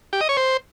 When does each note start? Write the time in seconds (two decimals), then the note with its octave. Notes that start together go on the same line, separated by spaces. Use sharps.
0.13 G4
0.21 D#5
0.29 C#5
0.37 C5